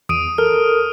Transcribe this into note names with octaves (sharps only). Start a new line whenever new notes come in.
E2 D#6 D7 D#7
A4 A#4 F6